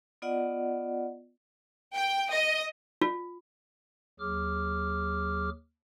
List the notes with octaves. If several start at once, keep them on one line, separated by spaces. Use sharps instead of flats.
B3 F4 D5 D#5 F#5
G5
D#5
F4
D#2 F#3 G#4 D6 F6